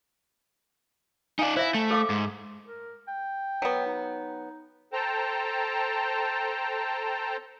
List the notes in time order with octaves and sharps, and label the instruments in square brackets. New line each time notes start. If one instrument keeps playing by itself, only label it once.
[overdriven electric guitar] D#4 D5 [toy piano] F5 G#5
[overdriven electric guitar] E4 [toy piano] C5 E5 F5
[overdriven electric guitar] A3
[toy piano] A4 F5 D6
[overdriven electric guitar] G#2
[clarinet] A#4
G5
[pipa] F#3 B3
[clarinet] D#4
[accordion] A4 C5 G5 A5 A#5